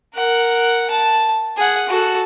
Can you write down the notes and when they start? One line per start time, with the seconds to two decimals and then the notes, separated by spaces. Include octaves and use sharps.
0.14 A#4 F#5
0.91 A5
1.57 G#4 F#5
1.89 F#4 A4